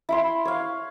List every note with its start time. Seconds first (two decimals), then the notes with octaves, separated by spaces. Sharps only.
0.09 E4 B5 C6
0.45 C#5 F5